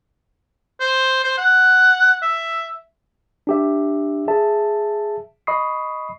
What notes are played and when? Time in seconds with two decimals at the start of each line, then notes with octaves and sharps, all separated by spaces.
0.81 C5
1.24 C5
1.38 F#5
2.22 E5
3.47 D4 G4 E5
4.28 G#4 E5 A5
5.47 D#5 B5 C#6 D#6 C7